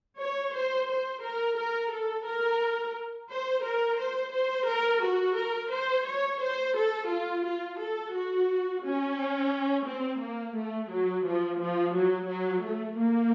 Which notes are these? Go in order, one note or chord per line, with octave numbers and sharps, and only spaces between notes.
C#5
C5
C5
A#4
A#4
A4
A#4
C5
A#4
C5
C5
A#4
F#4
A#4
C5
C#5
C5
A4
F4
F4
A4
F#4
C#4
C4
A#3
A3
F#3
F3
F3
F#3
F#3
A3
A#3